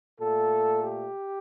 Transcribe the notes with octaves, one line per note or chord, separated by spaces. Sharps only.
A#2 A3 A4
G4